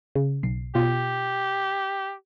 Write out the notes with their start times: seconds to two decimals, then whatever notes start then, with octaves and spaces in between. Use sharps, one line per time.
0.15 C#3
0.43 B1 C7
0.75 B2 F4 G4